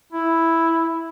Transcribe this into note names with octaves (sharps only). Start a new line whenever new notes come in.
E4